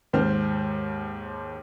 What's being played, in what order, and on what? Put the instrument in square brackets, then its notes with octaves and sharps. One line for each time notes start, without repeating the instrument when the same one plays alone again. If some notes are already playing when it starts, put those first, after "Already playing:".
[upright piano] D#2 G#2 C5 F6